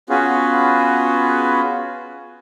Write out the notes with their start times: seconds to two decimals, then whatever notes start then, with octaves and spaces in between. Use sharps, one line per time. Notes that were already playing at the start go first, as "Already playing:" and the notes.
0.10 B3 C#4 F4 F#4 G#4 B4